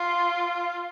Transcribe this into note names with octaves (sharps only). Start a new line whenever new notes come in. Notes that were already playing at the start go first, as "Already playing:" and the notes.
Already playing: F4